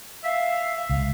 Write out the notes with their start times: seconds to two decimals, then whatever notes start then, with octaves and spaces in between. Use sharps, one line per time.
0.24 E5 F5
0.90 C#2 F5